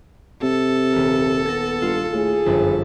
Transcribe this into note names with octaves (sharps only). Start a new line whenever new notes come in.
C3 A4
D#1 A#4
B3 A6 A#6
G2 F4
A2 G#4
G1 F#2 F3 B4